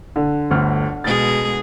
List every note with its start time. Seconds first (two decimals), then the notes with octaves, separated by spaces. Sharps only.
0.16 D3
0.51 G1 D2 F6
1.04 B2 G#3 G#4 A6